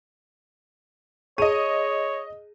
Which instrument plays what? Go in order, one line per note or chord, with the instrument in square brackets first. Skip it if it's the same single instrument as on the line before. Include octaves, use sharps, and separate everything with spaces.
[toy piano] G#4 A5 [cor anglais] C#5 [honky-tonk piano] D#5 D#7